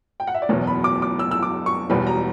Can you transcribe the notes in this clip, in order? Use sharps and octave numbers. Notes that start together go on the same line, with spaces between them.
G5
F#5
E5
D5
F#1 E2 B2 C#5
B5
D6
D6
E6
E6
D6
C#6
E1 E2 B2 G3 B3 B5
A#5